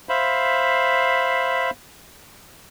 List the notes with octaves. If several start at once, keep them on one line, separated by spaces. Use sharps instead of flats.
C5 E5 F5 B5